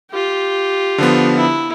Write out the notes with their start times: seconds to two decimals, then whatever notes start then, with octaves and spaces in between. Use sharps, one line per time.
0.11 F4 G4
0.98 D3 F3 B3
1.36 E4